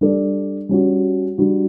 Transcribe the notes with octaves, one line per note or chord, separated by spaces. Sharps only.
G3 D4 A4 D5
G3 C#4 F#4
G3 D4 F#4